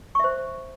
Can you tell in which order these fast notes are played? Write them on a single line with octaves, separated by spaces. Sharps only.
C#6 E5 C5